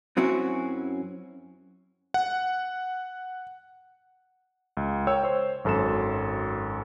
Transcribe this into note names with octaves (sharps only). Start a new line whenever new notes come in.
F#2 F#3 C4 C#4 E4 F#4
F#5
C#2
A#4 C#5 G5 E6
C5 C#5
G#1 F#2 A4 E6 E7